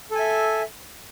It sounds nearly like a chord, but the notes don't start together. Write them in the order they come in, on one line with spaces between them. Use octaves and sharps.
A4 G#5 E5